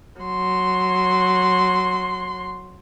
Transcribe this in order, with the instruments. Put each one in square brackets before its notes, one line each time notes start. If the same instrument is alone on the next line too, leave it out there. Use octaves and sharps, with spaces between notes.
[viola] F#3 C6